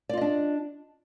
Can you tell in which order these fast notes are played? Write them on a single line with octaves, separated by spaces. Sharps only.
D5 F4 D#5 D4